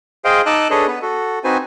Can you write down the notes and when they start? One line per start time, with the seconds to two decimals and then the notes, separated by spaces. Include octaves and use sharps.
0.25 G#4 C5 D#5 F5 G5
0.46 D#4 D#5 A5 D6 E6 F#6
0.70 D4 G#4 A4 B4 C#5 D#5
0.87 B3 B4
1.02 F#4 A4
1.44 C4 D#4 F#4 B4 C5 G#5